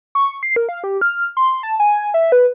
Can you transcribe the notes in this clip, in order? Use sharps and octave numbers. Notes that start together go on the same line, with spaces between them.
C#6
C7
A#4
F5
G4
F6
C6
A5
G#5
E5
B4